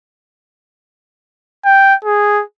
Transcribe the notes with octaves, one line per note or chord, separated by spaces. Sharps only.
G5
G#4